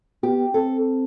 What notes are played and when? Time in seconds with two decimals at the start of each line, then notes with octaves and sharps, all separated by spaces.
0.23 B3 G4
0.54 C4 A4